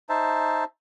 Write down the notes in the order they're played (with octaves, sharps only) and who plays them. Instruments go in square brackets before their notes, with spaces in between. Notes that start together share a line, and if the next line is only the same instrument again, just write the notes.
[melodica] D#4 C5 E5 A5